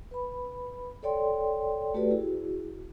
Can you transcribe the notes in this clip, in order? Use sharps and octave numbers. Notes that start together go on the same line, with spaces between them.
B4 B5
A4 C#5 D5 G5 C6
A3 F#4 G4 A4 B4 D5
E4 F#4 G#4